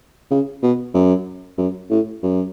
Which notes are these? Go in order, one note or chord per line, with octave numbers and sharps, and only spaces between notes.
C#3
B2
F#2
F#2
A2
F#2